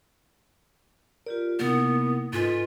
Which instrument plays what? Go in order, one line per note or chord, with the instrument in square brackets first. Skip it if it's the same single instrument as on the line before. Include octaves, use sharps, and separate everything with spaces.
[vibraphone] F4 G4 D5 [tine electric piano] A#4
[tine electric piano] C3 A#3 [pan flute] B3 [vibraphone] D#4 E4 A#4
[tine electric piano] G#2 D#4 G#5 [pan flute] F4 [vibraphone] A4 B4 D#5